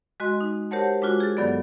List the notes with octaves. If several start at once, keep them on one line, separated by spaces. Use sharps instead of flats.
G#3 F#4 D#5 C6
D#4
G4 A#4 C5 C#5 F#5 A5
G#3 D4 F4 F#4
G#4 A6
G2 D#3 F#3 B3 A4 D5